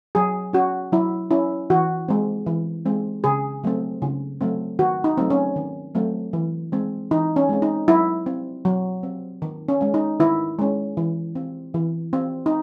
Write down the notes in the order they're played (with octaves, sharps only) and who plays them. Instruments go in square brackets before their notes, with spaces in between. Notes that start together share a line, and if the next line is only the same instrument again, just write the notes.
[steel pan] F#3 G#4
C#4 F#4
F#3 E4
C#4 E4
E3 F#4
G#3 C4
E3
G#3 C4
C#3 G#4
F#3 A3 C4
C#3
F#3 A3 C4
D#3 F#4
D#4
F#3 A3 C4
C#4
D#3
F#3 A3 C4
E3
G#3 C4
E3 D#4
C#4
G#3 C4
D#4
F#3 E4
C4
F#3
C4
D#3
C#4
G#3 C#4
D#4
D#3 E4
G#3 C#4
E3
C4
E3
C4
D#4